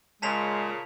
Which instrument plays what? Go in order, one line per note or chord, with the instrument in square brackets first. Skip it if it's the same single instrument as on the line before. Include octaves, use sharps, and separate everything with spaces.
[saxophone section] A#2 C#3 [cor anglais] G#3 [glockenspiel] A5 B6 F7